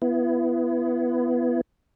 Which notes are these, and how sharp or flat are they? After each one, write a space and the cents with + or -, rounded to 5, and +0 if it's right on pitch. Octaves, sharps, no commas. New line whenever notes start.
B3 +0 E4 +30